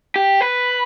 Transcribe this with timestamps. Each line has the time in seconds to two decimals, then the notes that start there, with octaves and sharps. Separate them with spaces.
0.16 G4
0.41 B4